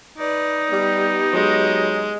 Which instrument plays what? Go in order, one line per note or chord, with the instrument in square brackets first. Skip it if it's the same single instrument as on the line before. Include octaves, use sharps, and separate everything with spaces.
[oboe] D#4 [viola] B4 D5
[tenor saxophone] G3 [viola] B3 G4
[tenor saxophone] F#3 [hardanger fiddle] G#3